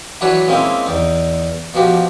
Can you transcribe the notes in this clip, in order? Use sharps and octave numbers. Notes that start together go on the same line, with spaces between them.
E3 F#3 D4 B4 C#5
G#3 A#3 C4 C#4 D#4 E4
E2 D#4
B2 F3 F#4 G4